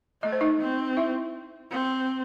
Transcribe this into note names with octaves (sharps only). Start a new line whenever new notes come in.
A3 D#5
C5
D#4 D#5
C4
E4 E5
C4